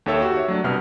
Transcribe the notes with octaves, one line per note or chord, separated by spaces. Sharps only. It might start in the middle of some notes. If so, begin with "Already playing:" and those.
D#2 D#3 A4 C#5 E5 E6
F#4 G4
C#5 E5
F#3 A3 D4
C2 B2 B3 F6